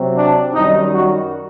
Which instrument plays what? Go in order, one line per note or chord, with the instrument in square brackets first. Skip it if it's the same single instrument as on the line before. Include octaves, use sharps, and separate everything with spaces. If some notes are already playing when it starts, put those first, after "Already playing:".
Already playing: [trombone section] C3 F#3 C4
D4
F#2 D#3 G3 D#4
F#4